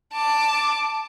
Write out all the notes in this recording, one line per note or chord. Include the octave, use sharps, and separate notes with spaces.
A5 D6